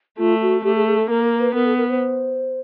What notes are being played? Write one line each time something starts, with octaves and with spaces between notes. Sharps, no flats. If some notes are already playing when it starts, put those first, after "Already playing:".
A3 F4
F#4
A3 G4
G#4
G#4
A4
A#3 A#4
A#4
B4
B3 A#4
A4
A#4
C5